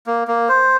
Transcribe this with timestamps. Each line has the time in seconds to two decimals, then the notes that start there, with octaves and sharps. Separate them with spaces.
0.07 A#3
0.28 A#3
0.49 C5